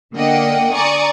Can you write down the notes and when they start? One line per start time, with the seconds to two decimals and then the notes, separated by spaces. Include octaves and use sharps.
0.14 D3 A#3 D5 D#5 F#5 G5
0.73 D5 G#5 A#5 C#6 D#6